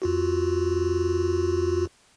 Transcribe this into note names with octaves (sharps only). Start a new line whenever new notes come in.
F2 F4 F#4